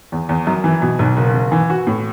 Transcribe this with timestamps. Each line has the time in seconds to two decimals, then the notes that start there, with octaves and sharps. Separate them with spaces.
0.12 E2
0.29 E2
0.47 F#2
0.64 E3
0.82 B2
0.99 B1
1.17 F#1
1.34 F#1
1.52 E3
1.70 F#4
1.87 A2